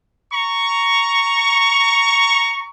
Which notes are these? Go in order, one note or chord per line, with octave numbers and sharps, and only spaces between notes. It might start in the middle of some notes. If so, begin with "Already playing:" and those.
A#5 C#6